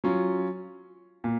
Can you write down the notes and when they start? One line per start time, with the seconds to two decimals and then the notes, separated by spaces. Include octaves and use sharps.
0.04 F#3 C#4 F4
1.24 A#2